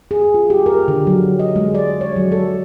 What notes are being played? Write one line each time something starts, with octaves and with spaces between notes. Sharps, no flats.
G#4
F4
G4
A#4
D3
F#3
D#5
G#3
D5
C#5
F#3
A4